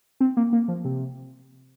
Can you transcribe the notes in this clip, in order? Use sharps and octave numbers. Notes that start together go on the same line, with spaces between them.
C4
A#3
A#3
F3
C3